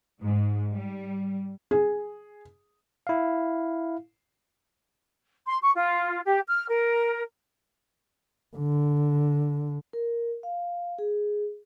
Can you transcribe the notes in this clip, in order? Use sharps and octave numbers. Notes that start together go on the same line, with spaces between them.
G#2
G3
G#4
E4 F5
C6
C#6
F4
G4
F6
A#4
D3
A#4
F5
G#4